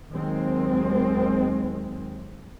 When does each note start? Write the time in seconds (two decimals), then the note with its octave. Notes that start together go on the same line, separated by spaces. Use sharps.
0.11 D#2 D#3 F#3 G#3 C4